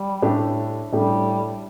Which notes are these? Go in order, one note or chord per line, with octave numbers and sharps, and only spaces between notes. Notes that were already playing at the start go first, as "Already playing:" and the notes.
Already playing: G3
A2 A3 D4 G4
A2 G3 A3 D4 G4